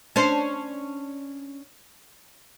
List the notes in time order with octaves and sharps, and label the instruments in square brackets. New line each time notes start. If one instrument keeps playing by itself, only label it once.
[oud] C#4 D4 C5